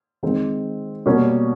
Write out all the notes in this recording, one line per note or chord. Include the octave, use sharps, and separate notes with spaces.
D#3 G#3 C4
B2 G3 A#3 C#4